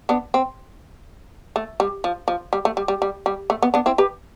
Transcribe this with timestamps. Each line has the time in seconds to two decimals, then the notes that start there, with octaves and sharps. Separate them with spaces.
0.09 B3 D4
0.34 C4
1.56 A3
1.80 G3
2.04 F3
2.28 F3
2.53 G3
2.65 A3
2.77 G3
2.88 G3
3.02 G3
3.26 G3
3.50 A3
3.62 B3
3.74 B3 D4
3.86 C4 E4
3.98 G4 B4